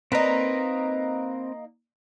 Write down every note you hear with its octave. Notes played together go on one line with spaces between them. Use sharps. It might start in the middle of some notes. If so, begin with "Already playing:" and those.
A#3 C4 D#4 B4 A#5